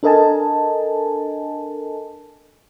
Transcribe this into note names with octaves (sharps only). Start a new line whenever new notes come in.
D4 A4 A#4 D#5 G#5 A5